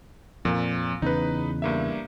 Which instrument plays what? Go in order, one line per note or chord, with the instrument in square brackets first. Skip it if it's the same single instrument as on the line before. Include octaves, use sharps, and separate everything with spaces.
[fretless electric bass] F2 [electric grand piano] A#2
[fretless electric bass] E2 C#3 [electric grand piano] D#4 B4
[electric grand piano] G2 A#3 E5